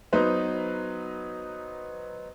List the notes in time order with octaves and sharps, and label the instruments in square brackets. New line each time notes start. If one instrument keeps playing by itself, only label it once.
[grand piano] F#3 B3 D#4 B4 C5